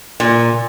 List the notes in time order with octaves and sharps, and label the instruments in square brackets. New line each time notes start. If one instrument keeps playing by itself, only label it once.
[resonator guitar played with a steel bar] A#2